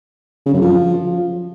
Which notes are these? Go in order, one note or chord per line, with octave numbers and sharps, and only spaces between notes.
C#3
F#2
F3